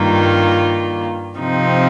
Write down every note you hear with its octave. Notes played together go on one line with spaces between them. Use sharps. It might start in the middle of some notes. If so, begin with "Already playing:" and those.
Already playing: G2 D#3 A#3 F4
C3 F3 C4 D#4